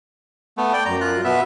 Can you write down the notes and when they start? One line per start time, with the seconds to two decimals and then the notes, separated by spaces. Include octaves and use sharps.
0.58 A3 B3
0.73 D5 G5
0.86 F#2 A#5
1.01 F4 F#6
1.24 B2 B3 E5